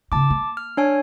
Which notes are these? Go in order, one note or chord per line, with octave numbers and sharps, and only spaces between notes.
C#3 D#4 A5 D6
A#3
F6
D4 C#5 G#5